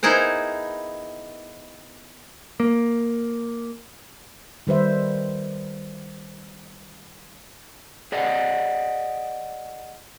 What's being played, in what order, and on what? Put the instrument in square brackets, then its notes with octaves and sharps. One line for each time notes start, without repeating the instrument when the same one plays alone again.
[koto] B3 D#4 E4 G#4 A#4 C5
[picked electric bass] A#3
[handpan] D#3 G3 B4 C5 E5
[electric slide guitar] G#4 D5 D#5 F#5